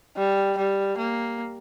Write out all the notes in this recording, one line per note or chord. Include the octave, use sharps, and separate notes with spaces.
G3
G3
A#3